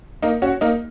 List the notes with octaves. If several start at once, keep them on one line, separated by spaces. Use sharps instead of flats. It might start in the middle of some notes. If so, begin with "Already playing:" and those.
A#3 D#4
C#4 F#4
A#3 D#4